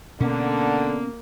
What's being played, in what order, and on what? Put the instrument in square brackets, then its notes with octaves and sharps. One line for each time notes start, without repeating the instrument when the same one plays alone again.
[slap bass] B2 C#4 [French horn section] D3 [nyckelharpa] A#3